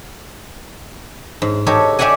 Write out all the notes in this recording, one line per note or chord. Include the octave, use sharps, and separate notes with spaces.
G#2
D#4 F#4 G4 A4 C#5
F#4 G4 D5 E5 F#5 G#5